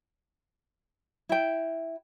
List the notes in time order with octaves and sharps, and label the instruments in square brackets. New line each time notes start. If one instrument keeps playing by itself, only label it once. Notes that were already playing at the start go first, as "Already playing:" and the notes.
[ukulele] E4 G5